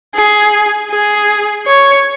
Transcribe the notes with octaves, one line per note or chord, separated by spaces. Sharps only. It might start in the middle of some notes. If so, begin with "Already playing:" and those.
G#4
G#4
C#5